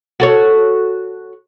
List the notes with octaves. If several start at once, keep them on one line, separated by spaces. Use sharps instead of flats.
F#4 A4 C#5